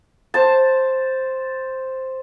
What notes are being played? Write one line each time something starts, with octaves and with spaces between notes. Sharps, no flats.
C5 A5